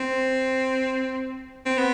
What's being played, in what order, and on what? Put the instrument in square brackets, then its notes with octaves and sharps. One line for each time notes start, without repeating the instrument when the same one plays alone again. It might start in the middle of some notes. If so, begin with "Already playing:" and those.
Already playing: [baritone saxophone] C4
C4
B3